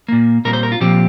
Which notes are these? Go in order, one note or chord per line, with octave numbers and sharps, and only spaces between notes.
A#2 A#3
A#2 G3 C4 A#4
C5
A#4
F4
A#2 F3 C4 G4